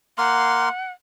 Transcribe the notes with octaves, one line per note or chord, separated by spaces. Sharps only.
A#3 F5 F#5 C6